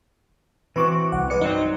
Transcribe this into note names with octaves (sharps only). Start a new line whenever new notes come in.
E3 C4 F#4 B4 C#6 D6
C2 F#5
G#3 B4 D5 C#7
G2 F#3 C4 D#4